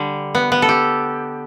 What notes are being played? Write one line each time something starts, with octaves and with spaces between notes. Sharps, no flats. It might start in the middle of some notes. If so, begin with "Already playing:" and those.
Already playing: D3 G3
B3
B3
A4
G4